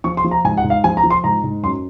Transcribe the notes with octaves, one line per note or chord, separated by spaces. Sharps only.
F3 C#6
C6
F3
A#5
G#2 G#5
F#5
G#2
F5
F3 G#5
A#5
F3
C6
G#2 A#5
G#2
F#2 C6